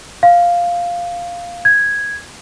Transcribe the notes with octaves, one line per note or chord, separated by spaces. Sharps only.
F5
G#6